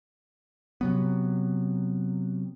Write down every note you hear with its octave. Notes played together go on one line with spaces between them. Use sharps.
C3 F#3 B3